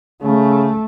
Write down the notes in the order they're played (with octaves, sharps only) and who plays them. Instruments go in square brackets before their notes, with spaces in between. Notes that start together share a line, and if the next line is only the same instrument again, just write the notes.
[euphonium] C#3 [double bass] A3